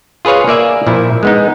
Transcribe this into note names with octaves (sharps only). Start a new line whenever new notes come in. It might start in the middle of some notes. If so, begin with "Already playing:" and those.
F4 G#4 B4 C#5 F5
A#3 D5 E5 G#5
A#2 F3 E4
G#3 B3 D#4